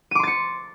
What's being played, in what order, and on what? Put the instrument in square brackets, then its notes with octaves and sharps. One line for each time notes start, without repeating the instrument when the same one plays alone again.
[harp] D#7
D6
C6
A6
C#7